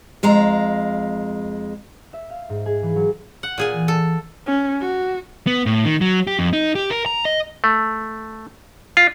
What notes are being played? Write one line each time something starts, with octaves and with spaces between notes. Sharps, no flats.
F2 G#3 F5 A#5
E5
F5
G#2
G#4
E3
F#3
F#5
A#2 G#4 G#5
E3
A4
C#4
F#4
B3
A2
D#3
F#3
G4
F2
D#4
G4
A#4
A#5
D#5
A3
F4